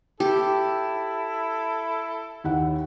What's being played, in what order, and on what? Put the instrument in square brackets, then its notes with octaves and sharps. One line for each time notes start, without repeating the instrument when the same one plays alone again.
[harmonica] E4 A4 [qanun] G4
[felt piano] D#2 E4 F#5